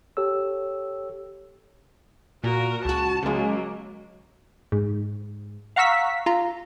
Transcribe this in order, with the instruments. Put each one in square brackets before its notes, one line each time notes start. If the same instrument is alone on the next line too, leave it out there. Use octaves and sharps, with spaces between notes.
[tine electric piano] G4 A4 C#5 E6
[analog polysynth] A#2 [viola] F#4 A#4
[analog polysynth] C#2 F#4 [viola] A5
[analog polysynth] C#3 G#3 [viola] F#3 A#3
[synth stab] G#2
F5 F#5 A#5 C#6 E6 B6
F4 A#5